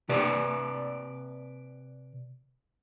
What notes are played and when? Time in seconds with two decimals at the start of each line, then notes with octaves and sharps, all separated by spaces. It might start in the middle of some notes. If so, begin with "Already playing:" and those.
0.09 C3 G4 B4 D5